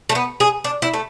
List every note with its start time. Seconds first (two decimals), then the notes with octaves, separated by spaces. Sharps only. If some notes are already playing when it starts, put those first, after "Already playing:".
0.09 A3
0.15 B3
0.40 G#4
0.64 D4
0.82 E4
0.93 A3